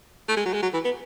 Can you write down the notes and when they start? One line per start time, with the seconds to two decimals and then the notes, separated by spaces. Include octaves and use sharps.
0.29 A3
0.37 G#3
0.45 F#3
0.53 G#3
0.62 F#3
0.73 E3
0.85 B3